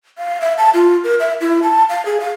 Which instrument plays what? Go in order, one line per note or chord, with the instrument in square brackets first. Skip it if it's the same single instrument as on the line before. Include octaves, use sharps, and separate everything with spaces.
[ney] F5
E5
A5
F4
A#4
E5
E4
A5
F5
G#4
F5